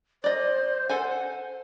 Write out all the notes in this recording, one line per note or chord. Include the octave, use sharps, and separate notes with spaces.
C5 D5 D#5
A4 C5 F#5 G#5